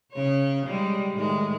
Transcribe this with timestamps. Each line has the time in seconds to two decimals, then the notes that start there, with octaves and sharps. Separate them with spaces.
0.12 C#3 C#5
0.67 G3 G#3
1.14 A2 D#3 G#3